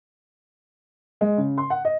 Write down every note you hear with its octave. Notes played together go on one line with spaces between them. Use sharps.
G#3
C#3
C6
F#5
D#5